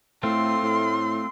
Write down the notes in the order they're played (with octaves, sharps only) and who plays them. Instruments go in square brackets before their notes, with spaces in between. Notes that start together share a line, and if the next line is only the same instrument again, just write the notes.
[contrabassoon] A2 [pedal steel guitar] A3 C4 F4 [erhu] C6
[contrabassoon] A2